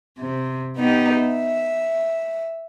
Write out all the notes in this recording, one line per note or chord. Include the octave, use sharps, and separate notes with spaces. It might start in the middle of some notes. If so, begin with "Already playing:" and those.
C3
B3 D#4 G4
E5